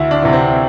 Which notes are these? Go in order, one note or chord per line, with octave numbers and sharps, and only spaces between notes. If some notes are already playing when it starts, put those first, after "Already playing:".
Already playing: D2 E4
D4
C3 E3
C4